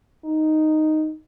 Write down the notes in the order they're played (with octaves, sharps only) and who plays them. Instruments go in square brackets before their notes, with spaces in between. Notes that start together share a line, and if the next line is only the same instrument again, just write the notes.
[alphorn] D#4